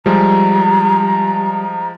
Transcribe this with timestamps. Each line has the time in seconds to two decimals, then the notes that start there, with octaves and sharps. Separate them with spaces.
0.06 F3 G3 G#3 A#5